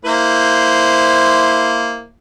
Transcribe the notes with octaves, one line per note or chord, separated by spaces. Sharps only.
A#3 E4 C5